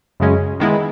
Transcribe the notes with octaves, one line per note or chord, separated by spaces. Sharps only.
F#2 C#3 G#3 C#4
D#3 G#3 B3 E4